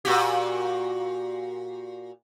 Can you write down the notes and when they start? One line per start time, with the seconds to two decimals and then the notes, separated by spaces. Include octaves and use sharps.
0.05 A#2 F#4 G4